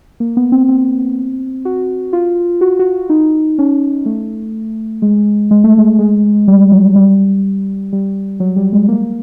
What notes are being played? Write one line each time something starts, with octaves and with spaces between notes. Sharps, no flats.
A#3
B3
C4
C4
F#4
F4
F#4
F#4
D#4
C#4
A3
G#3
G#3
A3
G#3
G#3
G3
F#3
G3
G3
F#3
G3
G#3
A#3